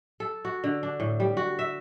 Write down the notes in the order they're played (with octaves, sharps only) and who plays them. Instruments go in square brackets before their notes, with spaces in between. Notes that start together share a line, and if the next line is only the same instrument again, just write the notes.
[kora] A4
F#4
D3
D4
A2
G3
F#4
E5